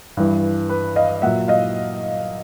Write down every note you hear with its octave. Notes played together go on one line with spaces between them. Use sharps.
G2 E3
B4
D#5 F5
A#2 F#3 E5 F#5
D#5 F5